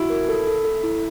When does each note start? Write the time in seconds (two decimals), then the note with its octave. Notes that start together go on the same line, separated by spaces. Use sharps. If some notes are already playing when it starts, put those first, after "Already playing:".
Already playing: E4 F#4
0.10 A#4
0.29 A4
0.47 A4
0.65 A4
0.84 E4